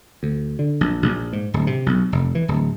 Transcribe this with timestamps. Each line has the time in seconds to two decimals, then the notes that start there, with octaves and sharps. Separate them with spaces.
0.23 D2
0.59 D3
0.81 A#1
1.03 A#1
1.33 G#2
1.54 D1
1.67 C3
1.86 B1
2.12 F1
2.35 E3
2.48 D1